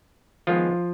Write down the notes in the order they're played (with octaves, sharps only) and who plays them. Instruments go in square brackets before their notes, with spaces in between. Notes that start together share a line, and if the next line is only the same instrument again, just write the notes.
[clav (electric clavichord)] D#3 F3 G#3 B3 F4